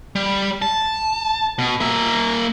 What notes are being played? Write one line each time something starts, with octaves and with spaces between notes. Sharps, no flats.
G3
A5
B2
A#3 E5